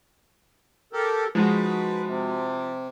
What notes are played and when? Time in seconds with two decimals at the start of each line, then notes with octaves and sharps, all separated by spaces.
0.93 G4 A4 A#4
1.35 F3 G#3 D#4 F#4 B4
2.06 C3